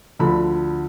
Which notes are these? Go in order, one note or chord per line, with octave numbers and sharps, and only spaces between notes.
D2 D3 F3 B5